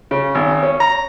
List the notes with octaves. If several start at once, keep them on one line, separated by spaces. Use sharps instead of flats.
C#3
G#1
C#4
A#5